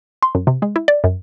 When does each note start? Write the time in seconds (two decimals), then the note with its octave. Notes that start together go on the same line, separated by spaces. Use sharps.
0.23 C6
0.35 F#2
0.47 C3
0.62 G#3
0.76 E4
0.88 D5
1.04 F#2